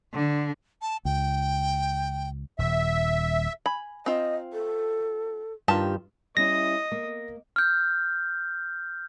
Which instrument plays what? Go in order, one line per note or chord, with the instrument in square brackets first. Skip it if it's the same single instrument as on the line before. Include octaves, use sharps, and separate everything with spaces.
[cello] D3
[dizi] A5
[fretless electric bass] C#2 [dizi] G5
[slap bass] D#1 [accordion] E5
[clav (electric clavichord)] G#5 [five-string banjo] B5
[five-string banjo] C4 F4 [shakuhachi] D#5
[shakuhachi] A4
[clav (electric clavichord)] G2 F4 [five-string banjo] D#3 G4 A5
[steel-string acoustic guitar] G3 C#4 E4 [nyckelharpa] D#5 [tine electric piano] A#6
[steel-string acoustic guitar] A#3
[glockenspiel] F6 G6